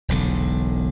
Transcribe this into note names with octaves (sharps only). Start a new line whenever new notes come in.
E1 B1 D3